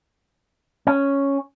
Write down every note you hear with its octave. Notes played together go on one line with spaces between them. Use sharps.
C#4